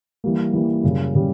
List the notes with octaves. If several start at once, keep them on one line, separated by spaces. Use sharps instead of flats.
E3 G3 A#3
E3 G3 A#3
F#2 C#3 G3
C#3 G3